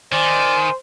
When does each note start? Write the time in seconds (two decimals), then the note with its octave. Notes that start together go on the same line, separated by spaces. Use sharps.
0.12 D#3 C5 D5 G#5